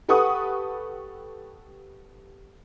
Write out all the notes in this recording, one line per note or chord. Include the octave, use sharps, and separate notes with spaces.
G4 A4 B4 F#5 C#6 D#6